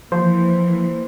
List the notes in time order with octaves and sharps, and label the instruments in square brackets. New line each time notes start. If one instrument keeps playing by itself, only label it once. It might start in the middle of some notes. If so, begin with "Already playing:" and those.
[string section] E3 A#3 [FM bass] F3 [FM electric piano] C5